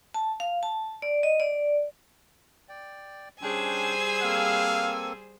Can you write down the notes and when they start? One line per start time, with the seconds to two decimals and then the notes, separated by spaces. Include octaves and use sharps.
0.14 A5
0.40 F5
0.63 A5
1.02 D5
1.23 D#5
1.40 D5
2.69 D5 G5
3.42 G3 C#4 D4 G#4 C5 G5 G#5 E6
4.23 A#3 C4 A4 F5